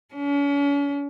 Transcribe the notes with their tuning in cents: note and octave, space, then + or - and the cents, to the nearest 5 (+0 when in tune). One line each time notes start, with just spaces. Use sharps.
C#4 +40